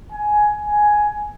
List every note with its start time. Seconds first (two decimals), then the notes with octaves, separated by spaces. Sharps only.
0.12 G#5
0.67 G#5